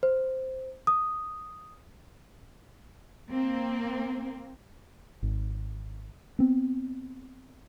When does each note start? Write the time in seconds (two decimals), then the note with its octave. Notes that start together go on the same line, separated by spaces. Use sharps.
0.03 C5
0.87 D#6
3.29 A#3 C4
5.23 G#1
6.39 B3 C4